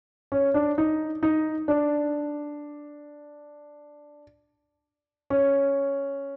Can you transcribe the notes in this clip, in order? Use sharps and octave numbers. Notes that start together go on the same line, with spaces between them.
C#4
D4
D#4
D#4
D4
C#4